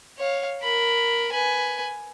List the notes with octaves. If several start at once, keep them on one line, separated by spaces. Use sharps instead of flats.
C#5 F5
A#4 B5
B4 G#5